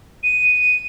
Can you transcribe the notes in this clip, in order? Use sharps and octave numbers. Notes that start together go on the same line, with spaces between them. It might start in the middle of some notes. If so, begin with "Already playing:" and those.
D#7